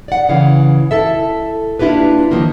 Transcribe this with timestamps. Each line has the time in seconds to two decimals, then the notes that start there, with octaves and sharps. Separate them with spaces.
0.08 D5 F#5
0.29 C#3 E3 F5
0.91 E4 A4 E5
1.79 A#3 D4 E4 F4 G4 B4
2.31 D#3 F3 A#3 F4